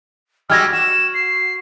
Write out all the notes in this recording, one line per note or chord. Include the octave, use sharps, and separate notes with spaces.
G3 G#3 F#4 E6 F6 G#6 A#6
F#4 E7
C7